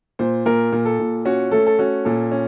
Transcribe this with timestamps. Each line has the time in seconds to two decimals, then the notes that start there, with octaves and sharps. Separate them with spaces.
0.19 A#2 C5
0.46 A#2 A#4
0.72 A#2
0.85 A4
0.99 A#2
1.25 C#4 F#4
1.52 A3 A4
1.66 A4
1.79 C#4 F#4
2.05 A#2 A4
2.31 C#4